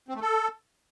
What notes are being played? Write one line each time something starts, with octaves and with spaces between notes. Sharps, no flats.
C4
A3
A4